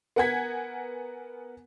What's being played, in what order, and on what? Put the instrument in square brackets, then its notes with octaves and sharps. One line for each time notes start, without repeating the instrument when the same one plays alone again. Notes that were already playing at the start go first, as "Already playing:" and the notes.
[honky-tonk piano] B3 A#4 F#5 G#5 G#6 B6